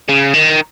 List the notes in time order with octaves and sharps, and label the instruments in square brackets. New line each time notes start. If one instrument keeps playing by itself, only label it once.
[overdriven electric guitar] C#3
D#3